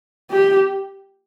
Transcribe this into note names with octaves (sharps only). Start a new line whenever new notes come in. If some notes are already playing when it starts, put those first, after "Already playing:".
G4